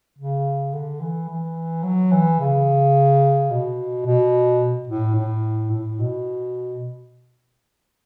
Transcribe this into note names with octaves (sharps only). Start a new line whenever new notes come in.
C#3
D3
E3
E3
F#3
E3
C#3
B2
B2
A2
A2
A2
B2